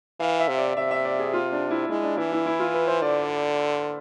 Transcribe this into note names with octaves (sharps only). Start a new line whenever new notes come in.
E3 F5
E5
C3
D5
C3 E5
E5
D5
G#4
F4
D4
E4
G#3 E4
D4
E3 E4
E4
E4
F4
B4
C5
D3 D5